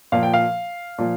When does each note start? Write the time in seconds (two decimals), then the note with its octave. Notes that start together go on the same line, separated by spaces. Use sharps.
0.12 A#2 F3 F5
0.23 G5
0.34 F5
0.98 A#2 F3